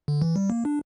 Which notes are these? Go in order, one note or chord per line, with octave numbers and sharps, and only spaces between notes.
D3
E3
G3
A#3
D4